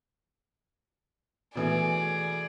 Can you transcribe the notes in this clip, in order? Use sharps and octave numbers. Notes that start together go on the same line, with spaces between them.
B2 E3 A3 G#4 D5